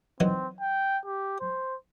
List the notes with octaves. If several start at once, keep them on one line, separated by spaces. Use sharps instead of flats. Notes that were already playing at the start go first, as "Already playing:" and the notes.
E3 F#3 C4 D#4
G5
G4
C5